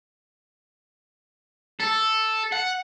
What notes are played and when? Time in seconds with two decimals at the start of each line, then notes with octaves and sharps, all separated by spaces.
1.80 A4
2.52 F#5